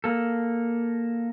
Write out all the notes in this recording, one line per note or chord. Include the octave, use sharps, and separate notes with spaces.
A#3 A4